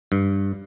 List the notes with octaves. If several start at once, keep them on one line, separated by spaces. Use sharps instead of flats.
G2